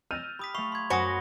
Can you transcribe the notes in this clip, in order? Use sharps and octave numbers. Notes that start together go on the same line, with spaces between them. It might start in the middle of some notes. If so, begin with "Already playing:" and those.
E6 F6 G6 A6 A#6 D#7
G4 B5 D#6 B6
A3 F5 B5 C#6 F7
C6 G#6
F#2 F#4 C5 G#5 B5 D#6 A#6 G7